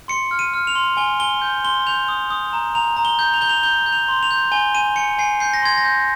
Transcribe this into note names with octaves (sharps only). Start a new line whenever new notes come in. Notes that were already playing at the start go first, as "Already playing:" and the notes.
C6 C#7
F6
D#7
F6
F7
C6
G#5 G7
G#5 G7
G6
C6 G7
G6 F7
D#6
D#6
A#5
A#5 F7
A#5
G7
G6
F7
G6 G7
F7
G6 G7
G6
F7
C6
F7
G6
G#5 G7
G#5 D#7
G#5 C#7
G#5 C7
G6 C7
A#6
C6 G#6
A#6
G6